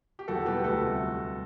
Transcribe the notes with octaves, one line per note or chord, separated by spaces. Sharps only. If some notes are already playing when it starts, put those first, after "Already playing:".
G4
E2 F#4 A4
B2 G3 G4 B4
B4
D2 F#4 A4
C3 G3